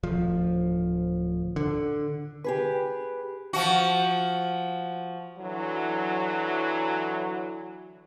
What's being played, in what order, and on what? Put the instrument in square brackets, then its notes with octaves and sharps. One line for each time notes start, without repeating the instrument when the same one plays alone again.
[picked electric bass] D1 F3
D3
[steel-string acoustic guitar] G4 G#4 B4
[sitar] F3 F#4
[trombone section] D3 E3 F#3